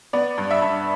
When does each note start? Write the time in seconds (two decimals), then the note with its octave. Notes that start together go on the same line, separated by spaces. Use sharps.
0.13 B3 D5
0.38 G2
0.51 E5
0.62 G2